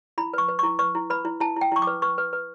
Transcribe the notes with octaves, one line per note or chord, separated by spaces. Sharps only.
E4 B5
B4 C#6
B4
E4 C#6
B4 C#6
E4
B4 B5
E4
E4 A5
E4 G5
E4 C#6
D6
B4
B4 C#6
B4
B4